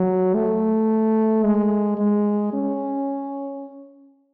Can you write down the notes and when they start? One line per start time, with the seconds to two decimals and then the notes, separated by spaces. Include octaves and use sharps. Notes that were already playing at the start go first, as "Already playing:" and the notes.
Already playing: F#3
0.35 A3
1.43 G#3
1.98 G#3
2.53 C#4